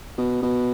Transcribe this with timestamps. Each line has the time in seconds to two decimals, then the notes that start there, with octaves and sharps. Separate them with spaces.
0.18 B2
0.42 B2